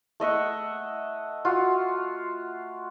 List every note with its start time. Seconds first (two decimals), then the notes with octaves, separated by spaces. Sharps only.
0.20 A3 D#5 E5 F#5
1.45 F4 F#4